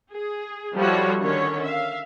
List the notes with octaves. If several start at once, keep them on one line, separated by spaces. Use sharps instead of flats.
G#4
F3 G3 E4 F#4 A4 C#5
D3 D#3 C#4 A#4 C#5
E5 F5